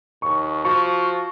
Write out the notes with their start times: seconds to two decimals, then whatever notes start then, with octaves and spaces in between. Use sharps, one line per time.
0.22 D#2 C#6
0.65 F3 F#4 C#6